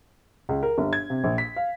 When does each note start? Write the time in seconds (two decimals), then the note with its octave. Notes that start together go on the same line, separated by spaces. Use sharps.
0.49 C#2
0.63 A#4
0.78 G1
0.93 G#6
1.10 C3
1.24 A#1
1.38 B6
1.56 F5